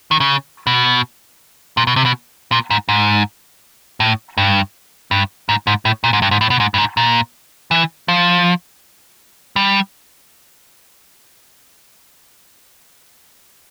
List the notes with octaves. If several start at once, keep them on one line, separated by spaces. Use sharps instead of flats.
D#3
C#3
B2
A#2
B2
C3
B2
A#2
G#2
G#2
A2
G2
G2
G#2
G#2
A2
A#2
G#2
G2
G#2
A2
B2
G#2
G2
G#2
A#2
E3
F3
G3